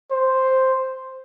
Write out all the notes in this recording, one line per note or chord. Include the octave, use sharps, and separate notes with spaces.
C5